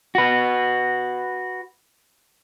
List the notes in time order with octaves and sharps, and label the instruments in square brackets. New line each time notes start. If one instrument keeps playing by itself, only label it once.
[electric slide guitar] F#4 B4